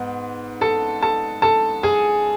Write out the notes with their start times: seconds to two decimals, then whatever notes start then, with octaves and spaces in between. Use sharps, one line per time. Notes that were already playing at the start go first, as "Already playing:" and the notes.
Already playing: G#2 B3
0.61 A4 A5
1.03 A4 A5
1.42 A4 A5
1.83 G#4 G#5